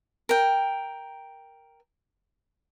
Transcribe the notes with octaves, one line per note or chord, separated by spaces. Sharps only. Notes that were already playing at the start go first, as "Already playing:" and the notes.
A#4 G5